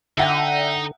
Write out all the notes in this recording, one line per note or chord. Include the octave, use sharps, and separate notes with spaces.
D3 D#4 E5 F#5 G5